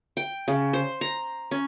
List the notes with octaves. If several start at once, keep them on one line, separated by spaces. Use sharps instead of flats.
G5
C#3
C5
A#5
C#4